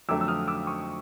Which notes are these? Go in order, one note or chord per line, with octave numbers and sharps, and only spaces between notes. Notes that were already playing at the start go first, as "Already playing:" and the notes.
F2 D3 F#3 A3 D6 E6
E6
D#6 F6
D6 E6
C#6 D#6